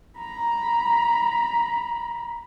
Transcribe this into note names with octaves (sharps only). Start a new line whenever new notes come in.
A#5 B5